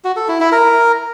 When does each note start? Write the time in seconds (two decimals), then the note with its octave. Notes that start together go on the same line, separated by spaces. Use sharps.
0.04 F#4
0.16 A4
0.28 E4
0.40 E4
0.52 A#4